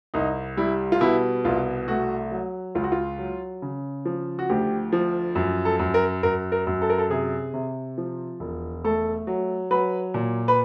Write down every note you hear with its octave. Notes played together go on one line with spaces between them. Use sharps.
C2 D#4
G3 E4
F4
B2 E4
C2 F4
A3 F#4
F#3
C#2 F4
F#4
F4
F#3
C#3
F3
F#4
D2 G4
F3
F#2
A4
F#2
A#4
F#2 A#4
A#4
F#2
A4
A#4
A4
C3 G#4
C3
F3
E1
A3 A4
F#3
F#3 B4
A#2
B4